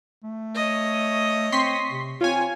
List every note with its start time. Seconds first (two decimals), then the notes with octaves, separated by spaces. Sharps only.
0.24 A3
0.55 C#5 D#5
1.52 C4 C6 C#6 B6
1.90 C3
2.21 C4 F4 C#5 G#5